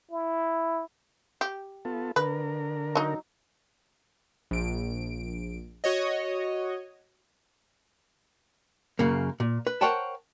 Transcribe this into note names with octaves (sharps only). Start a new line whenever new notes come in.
E4
G4
B3 F4 A4
D3 A#4 B4
F#3 D#4
A#1 D7
F#4 C#5 D#5
F#2 C#3 A#3
A#2
B4
A#4 C5 C#5 F#5 G5 A5